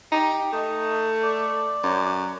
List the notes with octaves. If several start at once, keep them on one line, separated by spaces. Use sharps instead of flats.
D#4 G4
A3 D#4
D5
F#2